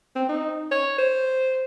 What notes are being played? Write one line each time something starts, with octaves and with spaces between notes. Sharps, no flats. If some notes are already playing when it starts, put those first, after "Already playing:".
C4
D#4
C#5
C5